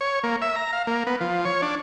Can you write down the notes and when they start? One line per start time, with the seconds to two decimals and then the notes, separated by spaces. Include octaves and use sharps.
0.01 C#5
0.24 A#3
0.42 E5
0.56 A#5
0.73 F5
0.87 A#3
1.07 B3
1.21 F3
1.45 C#5
1.62 D4